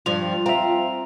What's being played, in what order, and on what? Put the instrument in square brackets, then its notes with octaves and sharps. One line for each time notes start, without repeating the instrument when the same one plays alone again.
[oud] G2 F3 [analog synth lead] F4 [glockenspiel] F7
[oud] C4 [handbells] E5 F5 [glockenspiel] A#5 F7